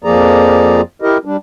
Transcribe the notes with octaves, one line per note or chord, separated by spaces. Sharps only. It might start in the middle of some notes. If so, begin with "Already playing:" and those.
F2 F3 A#3 G#4 D5 A#5
E4 G4 A#4 D#5
G3 D4